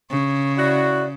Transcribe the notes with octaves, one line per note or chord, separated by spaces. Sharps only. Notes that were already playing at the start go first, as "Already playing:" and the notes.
C#3 C#6
E4 F#4 D5